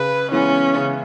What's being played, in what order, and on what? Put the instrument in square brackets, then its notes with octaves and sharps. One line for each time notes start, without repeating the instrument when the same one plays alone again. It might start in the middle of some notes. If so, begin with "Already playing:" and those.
Already playing: [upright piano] C#3 [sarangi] B4
[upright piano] E3 G#3 B3 E4 [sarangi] C#4
[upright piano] C#3